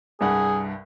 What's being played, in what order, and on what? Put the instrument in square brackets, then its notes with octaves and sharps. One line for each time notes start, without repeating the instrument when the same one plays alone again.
[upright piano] C2 G2 F#5 [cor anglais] G#4